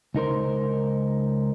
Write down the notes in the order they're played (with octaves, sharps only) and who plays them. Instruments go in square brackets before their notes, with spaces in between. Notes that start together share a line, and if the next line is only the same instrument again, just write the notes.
[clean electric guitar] C#2 D#4 A#4 C5